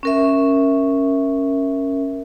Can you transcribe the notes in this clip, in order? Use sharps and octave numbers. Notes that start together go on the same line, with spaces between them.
C#4 A#4 E5